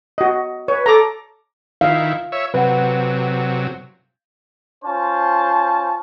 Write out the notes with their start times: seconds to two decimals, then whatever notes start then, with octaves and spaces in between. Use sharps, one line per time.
0.18 F#4 D#5
0.68 B4 C#5
0.86 A4 A#5 D6
1.81 D#3 E4 F5
2.32 C#5 E5
2.54 C3 F#3 B4 F#5
4.85 C#4 F4 C5 A5